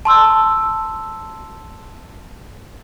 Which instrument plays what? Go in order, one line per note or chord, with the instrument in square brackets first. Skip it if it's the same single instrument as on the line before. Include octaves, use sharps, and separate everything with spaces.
[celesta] A5 C6 E6